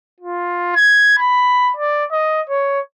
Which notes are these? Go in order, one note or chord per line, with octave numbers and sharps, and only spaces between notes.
F4
G#6
B5
D5
D#5
C#5